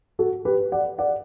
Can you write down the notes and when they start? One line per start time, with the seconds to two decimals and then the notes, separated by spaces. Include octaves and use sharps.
0.19 F#4 A4
0.45 G4 B4
0.72 D5 F#5
0.99 D5 F#5